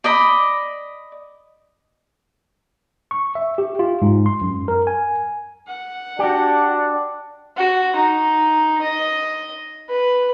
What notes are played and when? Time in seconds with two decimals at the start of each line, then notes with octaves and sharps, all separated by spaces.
0.04 D5 D#5 B5
3.11 C#6
3.35 E5
3.58 G4
3.79 F4
4.02 G#2
4.26 C6
4.42 F#2
4.68 A#4
4.87 G#5
5.67 F#5
6.19 D4 F#4 G4
7.57 F#4
7.96 D#4
8.82 D#5
9.89 B4